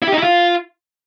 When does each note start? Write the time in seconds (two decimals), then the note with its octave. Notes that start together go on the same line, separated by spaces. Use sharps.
0.02 E4
0.08 G4
0.13 D#4
0.18 E4
0.23 F4